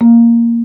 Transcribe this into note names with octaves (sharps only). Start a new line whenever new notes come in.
A#3